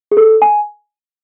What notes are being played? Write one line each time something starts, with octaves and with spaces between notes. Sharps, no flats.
G#4
A4
G#5